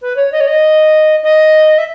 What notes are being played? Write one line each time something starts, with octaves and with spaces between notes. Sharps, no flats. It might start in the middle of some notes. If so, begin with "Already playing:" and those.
B4
C#5
D#5
C#5
D#5
D#5
E5